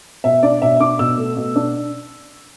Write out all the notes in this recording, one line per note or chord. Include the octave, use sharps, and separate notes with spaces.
B2 E5
D4 D5
B2 E5
D4 D6
B2 E6
A3
B2
D4